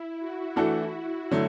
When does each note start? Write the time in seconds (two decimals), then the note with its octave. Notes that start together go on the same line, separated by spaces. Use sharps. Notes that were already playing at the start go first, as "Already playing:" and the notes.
Already playing: E4
0.19 F#4
0.56 E3 A3 D4 F#4 A4
1.31 D3 F#3 A3